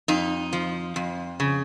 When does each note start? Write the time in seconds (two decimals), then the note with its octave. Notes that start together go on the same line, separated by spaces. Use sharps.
0.08 F2 D#4
0.53 F3
0.96 F2
1.40 C#3